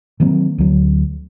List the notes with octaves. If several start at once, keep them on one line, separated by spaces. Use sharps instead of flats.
D#3 F#3 A#3 C4
D2 F#3